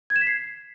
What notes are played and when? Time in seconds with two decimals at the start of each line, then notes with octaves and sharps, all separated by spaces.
0.10 G#6
0.16 E7
0.21 B6
0.27 C7